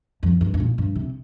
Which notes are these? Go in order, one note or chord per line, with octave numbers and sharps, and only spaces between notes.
F2
G2
G2
A#2
G2
C3